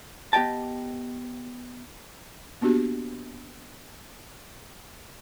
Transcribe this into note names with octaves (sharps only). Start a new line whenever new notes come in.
B3 G4 D#5 G5 A5
A#3 B3 D4 F#4 G4